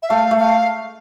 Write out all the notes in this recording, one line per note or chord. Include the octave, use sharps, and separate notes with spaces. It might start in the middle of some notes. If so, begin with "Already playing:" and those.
E5
A3 F5
A3
F5